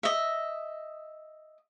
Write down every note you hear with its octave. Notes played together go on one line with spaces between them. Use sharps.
D#5 E5